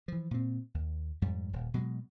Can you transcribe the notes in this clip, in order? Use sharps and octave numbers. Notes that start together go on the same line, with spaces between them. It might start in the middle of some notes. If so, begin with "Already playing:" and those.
E3 F3
A#2 C4
D#2
F2 G#2 G3
D#1
B2 F#3 G#3